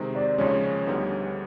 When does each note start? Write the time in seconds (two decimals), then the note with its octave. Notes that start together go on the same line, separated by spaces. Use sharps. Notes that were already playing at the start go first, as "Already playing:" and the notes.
Already playing: C3 D#3 G#3 C4
0.15 D5
0.38 D#2 C#3 F3 G#3 C#4 C#5
0.87 D2 D3 G3 B3 D#4